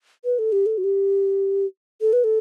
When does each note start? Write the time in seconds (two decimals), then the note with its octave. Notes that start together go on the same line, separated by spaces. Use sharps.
0.25 B4
0.39 A4
0.52 G4
0.66 A4
0.78 F#4
0.84 G4
2.01 A4
2.13 B4
2.24 A4